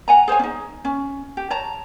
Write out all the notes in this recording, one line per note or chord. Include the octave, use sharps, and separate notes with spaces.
F#5 G#5 A#5
G#4 C5 C#5 G#5
C#4 D#4
C#4
G4
C#5 A5 A#5